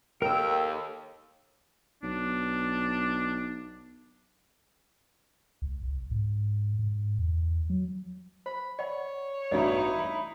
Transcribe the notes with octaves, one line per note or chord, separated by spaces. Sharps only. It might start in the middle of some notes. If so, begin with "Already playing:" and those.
D#2 A4 A#4 G5 E6
B1 D4
C#2
C2
G#2
G#2
E2
F#3
C5 B5
C#5 D5 F#5 B5
A1 G2 B2 D#4 E4 D5 F5
B5